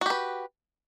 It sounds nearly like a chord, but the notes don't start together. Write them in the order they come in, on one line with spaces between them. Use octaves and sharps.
F#4 G4 B4